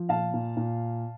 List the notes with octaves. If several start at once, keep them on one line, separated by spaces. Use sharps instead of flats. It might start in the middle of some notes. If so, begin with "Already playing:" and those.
Already playing: F3
A#2 F5 A5
A#2
A#2